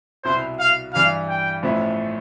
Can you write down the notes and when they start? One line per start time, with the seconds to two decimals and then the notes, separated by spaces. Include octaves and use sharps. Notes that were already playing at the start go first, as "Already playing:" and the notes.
0.24 C2 B2 B3 E4 C5
0.59 F5
0.94 G2 E3 G3 F5
1.29 G5
1.63 A1 A2 F3 B3 E4